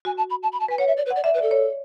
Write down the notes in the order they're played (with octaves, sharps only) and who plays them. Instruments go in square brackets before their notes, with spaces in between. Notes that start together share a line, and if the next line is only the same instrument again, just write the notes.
[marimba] F#4 [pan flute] G#5
[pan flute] A5
B5
A5
B5
A5
[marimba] B4 [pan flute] G#5
[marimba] C#5 [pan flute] F#5
[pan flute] E5
D5
B4
[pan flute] D5 [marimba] F#5
[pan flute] D5 [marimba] E5
[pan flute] B4
[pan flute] A4 [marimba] D5
[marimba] C#5